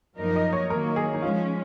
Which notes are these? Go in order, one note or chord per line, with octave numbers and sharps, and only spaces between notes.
F#2 F3 A#3 D#4 A#4
D#5
C#5
D#3 F#3 A#3 A#4
G#4
D#4
F3 G#3 C#4 F4